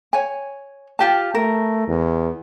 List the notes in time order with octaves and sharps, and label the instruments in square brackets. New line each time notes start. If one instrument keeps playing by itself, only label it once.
[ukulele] C#5 G#5
F4 G4 A5
[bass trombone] A3 [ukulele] A#4
[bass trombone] E2